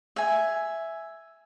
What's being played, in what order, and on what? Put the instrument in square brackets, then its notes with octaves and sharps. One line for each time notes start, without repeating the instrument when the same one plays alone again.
[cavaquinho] E5 G#5